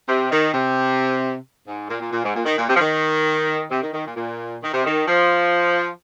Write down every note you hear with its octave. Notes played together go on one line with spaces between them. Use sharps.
C3
D#3
C3
G#2
A#2
A#2
A#2
G#2
A#2
D#3
A#2
C3
F3
D#3
C3
D#3
D#3
A#2
A#2
D#3
C3
D#3
F3